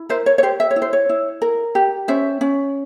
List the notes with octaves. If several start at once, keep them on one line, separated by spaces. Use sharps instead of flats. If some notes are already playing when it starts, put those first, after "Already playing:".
Already playing: E4
A#4 C5 E5
C#5
C#5
G4 C5
E5
C#5
E4
C5
C#5
E4
A#4
G4
C#4 C5 E5
C#4